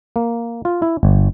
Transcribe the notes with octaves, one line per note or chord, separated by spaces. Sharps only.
A#3
F4
E4
G1